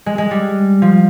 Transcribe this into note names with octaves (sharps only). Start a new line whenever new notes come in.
G#3
G#3
G3
F3